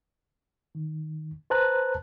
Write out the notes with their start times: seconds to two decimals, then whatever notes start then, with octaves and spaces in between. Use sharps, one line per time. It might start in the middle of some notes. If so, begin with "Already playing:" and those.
0.75 D#3
1.50 B4 C5 A5 A#5 F#6